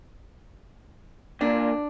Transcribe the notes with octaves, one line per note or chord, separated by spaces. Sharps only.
A#2 D4